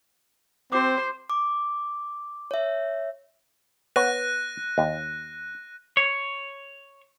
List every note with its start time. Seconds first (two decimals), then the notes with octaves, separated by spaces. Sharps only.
0.72 C4 F#4 C5 D6
1.30 D6
2.51 C#5 E5
3.96 B3 C#5 F#6 A#6 D#7
4.78 D#2
5.97 C#5